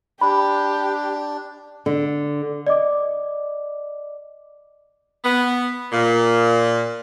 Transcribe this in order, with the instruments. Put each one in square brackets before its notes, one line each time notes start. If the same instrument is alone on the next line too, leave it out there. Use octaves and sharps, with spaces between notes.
[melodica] D4 [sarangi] G4 [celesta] B5
[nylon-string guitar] D3
[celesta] D5 D#5 D6
[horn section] B3
A#2